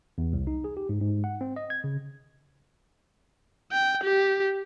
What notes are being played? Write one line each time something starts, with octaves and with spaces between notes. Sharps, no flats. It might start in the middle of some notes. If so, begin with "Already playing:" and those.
E2
C2
D#4
G#4
G4
G#2
G#2
F#5
C4
D#5
G#6
C#3
G5
G4